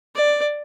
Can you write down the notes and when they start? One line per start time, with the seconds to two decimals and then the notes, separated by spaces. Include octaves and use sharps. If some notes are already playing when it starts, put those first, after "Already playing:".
0.15 D5